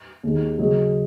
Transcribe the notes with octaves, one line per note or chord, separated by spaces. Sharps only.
D#2 D#3 G#3
C#3 F#3 C#4 G#4 D#5